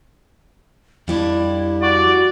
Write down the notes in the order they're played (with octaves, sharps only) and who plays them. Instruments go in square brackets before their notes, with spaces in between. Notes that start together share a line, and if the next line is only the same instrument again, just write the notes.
[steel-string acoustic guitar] F2 G3 D4 [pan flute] E4
[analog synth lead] F#4 [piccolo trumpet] D5